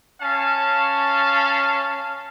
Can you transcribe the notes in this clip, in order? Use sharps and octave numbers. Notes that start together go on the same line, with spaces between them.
C#4 F5 A5